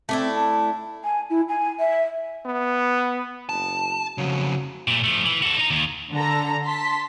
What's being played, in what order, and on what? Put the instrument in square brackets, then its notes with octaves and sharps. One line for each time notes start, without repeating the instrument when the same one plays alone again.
[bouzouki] A3 D4 E4 [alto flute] C4
[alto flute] A5
[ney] G#5
E4
G#5
E5
[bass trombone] B3
[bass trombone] F#1 [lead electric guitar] A5
[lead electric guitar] F2 C#3 [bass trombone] F#3
[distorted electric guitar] A#2 A3
F3 A3
E3
F#4 A4
D#4 A#5
D#2
[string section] D3 A4 A#5
A5 C6 B6